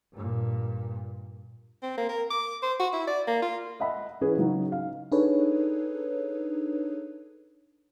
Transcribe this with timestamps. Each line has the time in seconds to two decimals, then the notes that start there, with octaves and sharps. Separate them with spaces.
0.13 G2 A#2
1.83 C4
1.98 A#3
2.09 A#4
2.30 D6
2.63 C5
2.80 F#4
2.93 E4
3.07 D5
3.27 A#3
3.42 F4
3.80 D#5 E5 F#5 B5
4.21 E3 C#4 G#4 B4
4.37 C#3 F#3 D#4
4.72 F5
5.12 D4 D#4 G#4 A4 B4 C#5